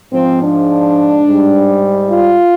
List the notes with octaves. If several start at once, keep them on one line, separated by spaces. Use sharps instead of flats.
G#2 F3 C4
D4
G#2 G3
F4